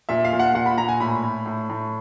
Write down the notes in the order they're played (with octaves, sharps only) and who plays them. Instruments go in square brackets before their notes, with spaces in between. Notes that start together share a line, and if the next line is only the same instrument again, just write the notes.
[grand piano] A#2 E5
F5
A#2
F#5
A#2 F#5
B5
A#2 A#5
G#5
A2 B5
A2
A2
A2